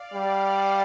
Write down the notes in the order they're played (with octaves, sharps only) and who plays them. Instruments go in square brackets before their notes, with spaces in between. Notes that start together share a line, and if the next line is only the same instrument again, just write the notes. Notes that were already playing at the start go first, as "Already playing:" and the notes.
Already playing: [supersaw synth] D5 F5
[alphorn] G3 [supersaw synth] D5 F5